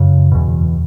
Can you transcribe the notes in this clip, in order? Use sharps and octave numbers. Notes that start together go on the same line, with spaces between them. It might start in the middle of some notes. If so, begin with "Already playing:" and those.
Already playing: F#2 C#3
E2 B2